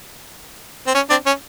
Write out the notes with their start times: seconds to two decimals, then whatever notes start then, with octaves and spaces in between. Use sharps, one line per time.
0.87 C4
0.95 C#4
1.10 C4 D4
1.26 C#4